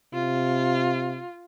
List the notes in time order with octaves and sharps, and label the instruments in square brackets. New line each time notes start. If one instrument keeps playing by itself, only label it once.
[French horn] C3 [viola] F4